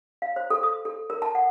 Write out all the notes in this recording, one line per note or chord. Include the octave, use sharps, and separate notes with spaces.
F5
C5
A4
D#6
A4
A#4
A5
F#5